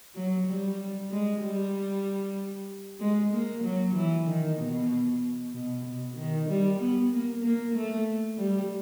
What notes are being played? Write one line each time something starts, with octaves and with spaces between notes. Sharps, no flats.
F#3
G3
G#3
G3
G#3
A#3
F#3
E3
D#3
B2
B2
B2
D#3
G3
B3
A#3
A#3
A3
G3